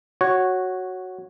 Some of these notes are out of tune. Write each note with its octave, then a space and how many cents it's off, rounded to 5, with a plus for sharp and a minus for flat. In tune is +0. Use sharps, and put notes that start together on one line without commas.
F#4 +0 C#5 -10